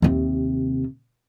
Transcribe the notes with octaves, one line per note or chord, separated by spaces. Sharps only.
D#2 C3